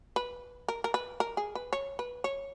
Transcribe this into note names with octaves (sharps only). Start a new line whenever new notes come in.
B4
A#4
A#4
B4
A#4
G#4
B4
C#5
B4
C#5